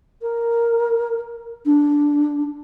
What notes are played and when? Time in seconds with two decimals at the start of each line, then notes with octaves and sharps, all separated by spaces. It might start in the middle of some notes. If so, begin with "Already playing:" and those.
0.22 A#4
1.66 D4